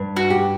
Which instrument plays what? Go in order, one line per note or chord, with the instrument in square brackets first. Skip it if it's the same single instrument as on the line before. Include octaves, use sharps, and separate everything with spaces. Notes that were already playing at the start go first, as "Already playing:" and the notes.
Already playing: [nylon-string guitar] G2
[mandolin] F#4
[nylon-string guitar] G4